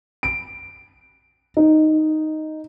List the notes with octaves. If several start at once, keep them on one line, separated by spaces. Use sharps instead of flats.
D7
D#4